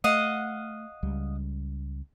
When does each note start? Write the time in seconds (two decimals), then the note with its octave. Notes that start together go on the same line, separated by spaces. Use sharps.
0.04 A3 D#5 F5 F#5
1.03 C#2 G3